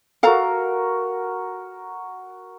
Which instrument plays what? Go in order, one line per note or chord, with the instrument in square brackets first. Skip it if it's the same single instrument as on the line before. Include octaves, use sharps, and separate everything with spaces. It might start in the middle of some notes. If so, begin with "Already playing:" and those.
[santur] F#4 A#4 [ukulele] A4 F5 A#5